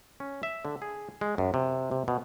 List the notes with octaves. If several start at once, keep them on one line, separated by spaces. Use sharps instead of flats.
C#4
E5
D3
G#4
G#3
F#2
C3
C3
B2